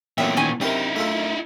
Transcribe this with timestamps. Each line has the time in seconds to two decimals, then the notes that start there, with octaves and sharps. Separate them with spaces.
0.18 A#2 E3 F#3 B3 C4 A#4 E5
0.37 D#3 C#4 G#5
0.61 F#2 C3 D#4 E4 A#4 C5 C6
0.96 A3 F4 A4